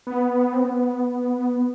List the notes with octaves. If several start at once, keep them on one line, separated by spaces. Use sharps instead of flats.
B3
C4
B3